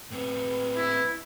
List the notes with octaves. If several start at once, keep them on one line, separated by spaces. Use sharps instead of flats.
A2 C4 B4
E4